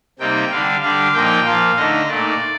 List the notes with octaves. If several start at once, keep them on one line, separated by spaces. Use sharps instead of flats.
C3 G3 A#3 D#4 G5
D3 G3 D4 F5
D3 G3 D4 F5
A#2 F3 A#3 D#4 G5
A#2 F3 A#3 F5
D3 A3 D#4 D#5
A#2 A3 D#4 D5